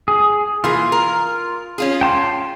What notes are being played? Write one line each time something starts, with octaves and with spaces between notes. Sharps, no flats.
G#4
E3 A#3 F4 G#4
A#4
C#4 F4 G#4
G5 A5 C6